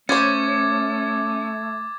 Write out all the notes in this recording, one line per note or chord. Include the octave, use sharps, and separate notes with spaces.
A3 C#4 C5 C#5 D6 G#6 A6